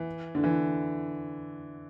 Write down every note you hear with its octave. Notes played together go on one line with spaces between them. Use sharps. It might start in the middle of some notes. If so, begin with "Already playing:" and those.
Already playing: E3
D3
E3